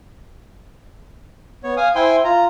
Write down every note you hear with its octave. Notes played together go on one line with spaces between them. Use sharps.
B3 C#5
F5 G#5 D#6
E4 C5 G5 G#5 C6
F4 A#5